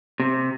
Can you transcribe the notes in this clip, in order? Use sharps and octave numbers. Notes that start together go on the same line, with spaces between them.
C3